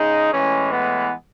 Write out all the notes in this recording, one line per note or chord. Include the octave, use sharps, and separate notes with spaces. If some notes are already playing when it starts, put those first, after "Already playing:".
Already playing: C#3 G#3 D#4
A2 E3 G#3 C#4
B3